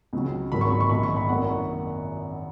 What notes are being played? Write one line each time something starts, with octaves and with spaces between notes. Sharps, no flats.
C#2 C#3 F#3 C#4
G#1 G#2 F#3 A#3 B5
C#6
B5
C#6
A#1 G#2 D#3 B5
C#6
B5
G#1 F#2 D#3 A#3 F#5